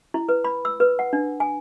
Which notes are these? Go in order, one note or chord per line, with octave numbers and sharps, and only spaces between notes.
E4
B4
B5
E6
B4
F#5
D4
G#5